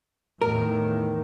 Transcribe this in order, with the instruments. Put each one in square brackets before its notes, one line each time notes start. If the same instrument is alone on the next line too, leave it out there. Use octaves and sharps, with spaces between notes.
[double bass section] E2 A2 D#3 [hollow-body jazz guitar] A#4